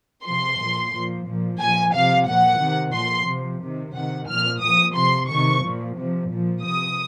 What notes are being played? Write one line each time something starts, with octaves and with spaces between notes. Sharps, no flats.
C3 F3 C6
A#2 F3
A#2 F3
A#2 F3
A#2 F3 G#5
C3 F3 F5
A#2 F3 F#5
C3 D#3
A#2 F3 C6
C3 F3
C3 D#3
C3 D#3 F#5
A#2 F3 F6
A#2 F3 D#6
C3 F3 C6
C3 D#3 C#6
A#2 F3
C3 F3
A#2 F3
C3 F3 D#6